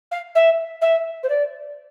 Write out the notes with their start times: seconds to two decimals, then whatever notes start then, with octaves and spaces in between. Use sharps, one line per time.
0.11 F5
0.35 E5
0.81 E5
1.23 C5
1.29 D5